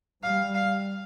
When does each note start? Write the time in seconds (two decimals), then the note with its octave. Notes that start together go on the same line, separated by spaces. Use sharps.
0.23 G3 F5
0.55 F5